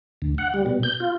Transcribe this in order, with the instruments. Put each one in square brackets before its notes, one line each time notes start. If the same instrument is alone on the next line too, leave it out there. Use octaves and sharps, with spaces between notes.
[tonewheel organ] D2
F#5
G3
B2
G6
F4